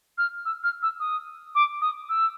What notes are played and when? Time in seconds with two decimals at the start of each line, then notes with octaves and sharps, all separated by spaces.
0.18 F6
0.45 E6
0.64 F6
0.82 E6
1.00 D#6
1.55 D6
1.81 D#6
2.09 E6